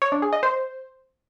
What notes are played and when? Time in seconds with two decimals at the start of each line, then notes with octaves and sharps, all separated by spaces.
0.02 C#5
0.12 D4
0.22 G#4
0.33 D#5
0.43 C5